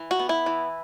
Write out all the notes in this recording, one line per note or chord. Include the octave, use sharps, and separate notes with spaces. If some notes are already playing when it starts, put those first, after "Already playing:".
Already playing: E3
F#4
B3
E4
E3